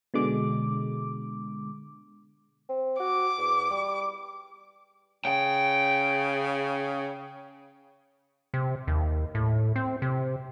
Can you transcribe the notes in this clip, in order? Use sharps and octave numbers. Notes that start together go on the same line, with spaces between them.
B2 D3 G#3 D6
C4
F#4 D6
E2
G3
C#3 G5
C3
D#2
A2
C4
C3